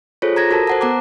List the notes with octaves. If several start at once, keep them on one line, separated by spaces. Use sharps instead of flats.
F4 G#4 A4 C5 C#5
A#5 G#6 A#6
F#4 A4 A#4 A5
C5 F#5 A5
B3 F#5 A#5 D6